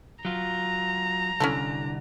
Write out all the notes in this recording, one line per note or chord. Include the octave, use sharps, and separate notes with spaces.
F#3 F4 A#5
C2 D3 C#4 E4 A4